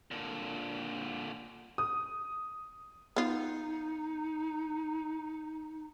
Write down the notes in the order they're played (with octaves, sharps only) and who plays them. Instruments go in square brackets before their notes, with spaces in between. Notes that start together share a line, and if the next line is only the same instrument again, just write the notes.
[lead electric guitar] A#2 D3
[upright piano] D#6
[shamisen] B3 F4 [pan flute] D#4